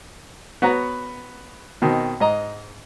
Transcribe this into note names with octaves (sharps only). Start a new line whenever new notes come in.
B3 F#4 B4 C#5 A#5
B2 D#3 C4
G#2 D#5 A#5